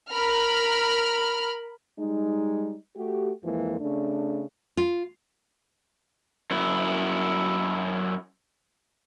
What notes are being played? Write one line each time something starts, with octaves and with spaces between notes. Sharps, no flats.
A#4 B5 F6
G3 G#3 D#4
A3 F#4 G4
F2 E3 F3 G#3 A#3
C#3 A3 D4
F4
F#2 E4